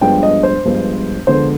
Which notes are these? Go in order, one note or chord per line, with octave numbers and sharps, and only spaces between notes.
G2 F3 G#3 B3 D4 G5
D#5
C5
G2 F3 G#3 B3
D3 F3 G#3 B3 C5